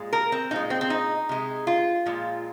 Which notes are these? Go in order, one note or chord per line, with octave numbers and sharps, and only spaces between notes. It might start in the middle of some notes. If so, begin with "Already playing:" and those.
Already playing: A#2 G#3
A#4
C4
A#2 G#3 D#4
C4
C4
D#4
C3 G#3
F4
A#2 F3 G#3